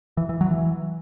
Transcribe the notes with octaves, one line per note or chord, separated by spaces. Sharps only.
E3
E3
F#3
E3